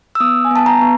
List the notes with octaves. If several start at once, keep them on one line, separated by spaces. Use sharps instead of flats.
E6
B3 D#6
G#5
B3 A5
A#5
B3